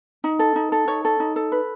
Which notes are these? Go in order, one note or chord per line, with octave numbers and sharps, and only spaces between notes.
D#4
A4
D#4
A4
D#4 C#5
A4
D#4
A4
B4